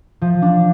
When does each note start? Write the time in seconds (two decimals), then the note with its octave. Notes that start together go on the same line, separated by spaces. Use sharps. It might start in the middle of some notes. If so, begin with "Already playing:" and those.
0.22 F3
0.42 D4